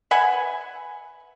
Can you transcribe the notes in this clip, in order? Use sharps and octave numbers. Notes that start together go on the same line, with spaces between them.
B4 E5 F#5 G#5